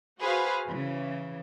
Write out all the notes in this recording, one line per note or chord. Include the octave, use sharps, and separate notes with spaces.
F#4 G#4 B4 C5 F5
C#3 E3